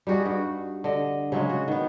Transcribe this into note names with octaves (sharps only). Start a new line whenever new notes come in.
G3 D#4 F#4 G#4
G2 F#4
D3 D#5
C#3 F#3 G#3
F#4
D#3 B3